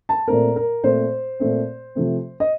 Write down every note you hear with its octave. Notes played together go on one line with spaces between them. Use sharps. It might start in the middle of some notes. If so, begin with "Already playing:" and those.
A5
A#2 A3 C4 A#4
A#4
A#2 A3 C4 C5
A#2 A3 C4
C3 F3 A3 C4
D#5